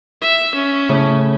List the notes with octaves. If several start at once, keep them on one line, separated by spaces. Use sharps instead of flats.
E5
C#4
A2 C#3 A3